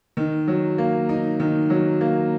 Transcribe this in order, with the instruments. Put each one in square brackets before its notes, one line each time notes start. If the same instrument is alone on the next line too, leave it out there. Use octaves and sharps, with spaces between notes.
[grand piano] D#3
F#3
A#3
D#4
D#3
F#3
A#3